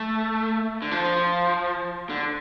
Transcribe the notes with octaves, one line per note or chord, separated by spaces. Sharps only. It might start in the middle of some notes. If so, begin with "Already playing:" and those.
Already playing: A3
D3
F3
D3